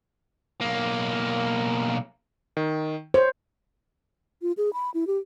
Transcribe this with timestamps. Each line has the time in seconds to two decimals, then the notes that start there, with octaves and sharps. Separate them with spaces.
0.61 B1 A#3
2.57 D#3
3.14 C5 C#5
4.42 F4
4.57 G#4
4.73 B5
4.94 E4
5.07 G4